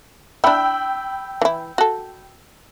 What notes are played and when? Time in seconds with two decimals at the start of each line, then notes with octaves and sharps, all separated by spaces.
0.44 D4 E4 G5 B5 E6
1.42 E3 E4
1.78 F#4 A4